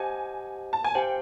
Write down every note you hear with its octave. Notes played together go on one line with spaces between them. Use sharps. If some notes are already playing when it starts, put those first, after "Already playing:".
Already playing: G4 C5 D#5 F#5 G#5 A5
A5
G#5
G4 C5 F5 G5